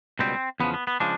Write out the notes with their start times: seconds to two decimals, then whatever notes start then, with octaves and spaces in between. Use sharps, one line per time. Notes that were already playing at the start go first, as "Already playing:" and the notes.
0.19 C#2 B2 G3 C4
0.60 E2 C#3 F3 B3
0.74 B3
0.87 B3
1.00 C#3 F3 G#3 D4